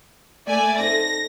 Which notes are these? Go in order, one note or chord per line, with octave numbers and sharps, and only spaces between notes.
A3 A#3 D5 E5 G#5
C4 D#4 A4 A#6